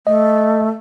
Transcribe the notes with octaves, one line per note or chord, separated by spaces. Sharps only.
A3 D#5